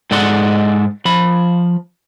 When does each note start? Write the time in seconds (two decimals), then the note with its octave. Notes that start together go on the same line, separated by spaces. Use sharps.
0.11 G#2 G#3 A4 D5 F#5 C6
1.05 F3 B5